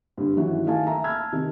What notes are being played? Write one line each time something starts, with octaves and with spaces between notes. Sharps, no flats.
G2 D3
D#3 E3 F#3 C#4 E4 F#4
D#3 A3 F5 G#5 A5
E5 A#5
A5 B5 E6 F6 G#6
C3 D#3